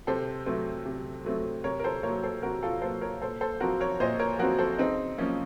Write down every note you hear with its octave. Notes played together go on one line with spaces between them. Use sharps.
C3 A4 C5
F#3 A3 C4
C3
F#3 A3 C4
C3 A#4 C#5
A#4
A4 C5
F#3 A#3 A#4 C#5
A4 C5
C3 F#4 A#4
F4 A4
F#3 A#3 A4 C5
A#4 C#5
A#2 A4 C5
A4 C5
F3 C4 F#4 A#4
A#4 C#5
A#2 C5 D#5
A#4 C#5
F3 C4 F#4 A#4
A4 C5
C#3 C4 D#4
F3 A#3 C#4